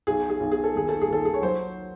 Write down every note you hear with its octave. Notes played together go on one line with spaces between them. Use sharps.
B1 G#4
G#4
B1
G#4
A4
D#2 G#4
A4
G#4
D#2 A4
G#4
C#5
F#3 C5